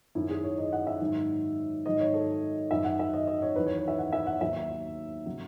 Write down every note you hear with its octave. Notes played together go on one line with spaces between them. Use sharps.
F#2 D#3 F#3 E4
G#4
C#5
D#5
F#5
E5
G#2 D#3 F#3
G#2 D#3 F#3 D#5
C#5
A4
F#2 D#3 F#3 E5
F#5
E5
D#5
D#5
C#5
E2 D#3 F#3 B4
C#5
C#5
E5
F#5
E5
F#5
D#2 D#3 F#3 E5
C#3 F#3